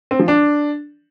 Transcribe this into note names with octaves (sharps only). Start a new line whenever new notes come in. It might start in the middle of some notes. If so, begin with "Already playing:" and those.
C4
F3
D4